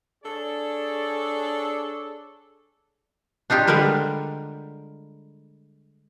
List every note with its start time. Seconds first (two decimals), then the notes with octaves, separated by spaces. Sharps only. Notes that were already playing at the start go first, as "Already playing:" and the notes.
0.24 D4 G#4 A4 C#5 D5
3.50 D4 D#4 F4 G4
3.67 D3 G3 G#3 A#4 B4